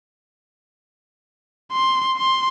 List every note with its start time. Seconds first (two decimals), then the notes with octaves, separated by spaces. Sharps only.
1.72 C6
2.18 C6